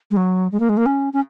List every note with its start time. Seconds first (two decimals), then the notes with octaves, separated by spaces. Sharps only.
0.11 G#3
0.17 F#3
0.52 G#3
0.60 A#3
0.69 G#3
0.77 A#3
0.86 C#4
1.13 C#4